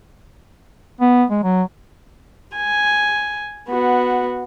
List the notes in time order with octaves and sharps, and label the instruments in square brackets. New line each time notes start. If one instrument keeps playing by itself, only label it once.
[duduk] B3
G#3
F#3
[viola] G#5
B3 F#4